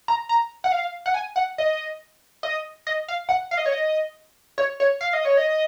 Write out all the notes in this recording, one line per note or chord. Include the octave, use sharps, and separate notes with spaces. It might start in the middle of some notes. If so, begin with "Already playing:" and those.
A#5
A#5
F#5
F5
F#5
G#5
F#5
D#5
D#5
D#5
F5
F#5
F5
D#5
C#5
D#5
C#5
C#5
F5
D#5
C#5
D#5